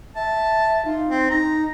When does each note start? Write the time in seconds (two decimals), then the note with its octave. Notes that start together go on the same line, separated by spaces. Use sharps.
0.16 E5 A5
0.85 D#4 F4
1.08 C4
1.30 D#4 A#5